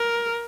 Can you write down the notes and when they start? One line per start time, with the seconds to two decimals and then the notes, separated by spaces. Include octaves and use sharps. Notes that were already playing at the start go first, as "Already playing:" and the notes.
Already playing: A#4